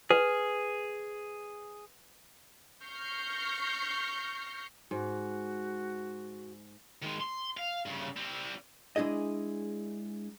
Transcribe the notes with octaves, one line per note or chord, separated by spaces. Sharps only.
G#4 B4
C#6 F6 G6 A#6 C7 C#7
G#2 F#4
D#3 G#3
C6
F5
G2 C#3
G3 C4
G#3 D4 E4 G#4 D#5